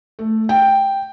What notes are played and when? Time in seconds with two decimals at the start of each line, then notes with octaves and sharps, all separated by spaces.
0.19 A3
0.49 G5